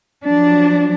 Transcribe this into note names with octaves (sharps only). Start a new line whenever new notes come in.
F3 F#3 D4